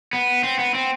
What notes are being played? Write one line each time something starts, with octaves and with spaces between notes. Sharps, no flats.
B3
C4
B3
C4